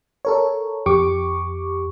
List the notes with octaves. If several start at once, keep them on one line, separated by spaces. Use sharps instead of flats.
A4 A#4 C#5
F2 G4 C#6 D6